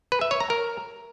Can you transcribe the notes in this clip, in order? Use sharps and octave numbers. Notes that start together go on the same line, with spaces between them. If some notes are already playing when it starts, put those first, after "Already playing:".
B4
E5
C#5
A#5
A#4